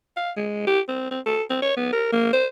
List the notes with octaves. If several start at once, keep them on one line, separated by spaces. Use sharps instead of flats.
F5
G#3
G4
C4
C4
A4
C4
C#5
B3
A#4
A#3
C5